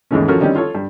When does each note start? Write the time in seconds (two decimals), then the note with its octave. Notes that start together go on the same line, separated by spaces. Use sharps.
0.11 D#2 G#2 C#3 E3 A3 C#4
0.28 F3 C#4 F4 F#4 A4 A#4
0.40 D3 D#3 G3 C4 C#4 D#4
0.55 F4 A4 C#5
0.75 G2